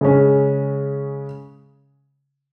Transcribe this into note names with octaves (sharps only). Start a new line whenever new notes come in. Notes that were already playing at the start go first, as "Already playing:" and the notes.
C#3 G#3 C#4